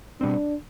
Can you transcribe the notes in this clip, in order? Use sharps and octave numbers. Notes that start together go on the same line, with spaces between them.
B2 G3 C4 D4